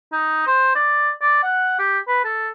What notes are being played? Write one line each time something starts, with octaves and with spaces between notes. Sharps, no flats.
D#4
C5
D5
D5
F#5
G4
B4
A4